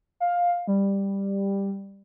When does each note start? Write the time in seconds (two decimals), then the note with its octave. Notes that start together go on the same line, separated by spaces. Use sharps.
0.20 F5
0.67 G3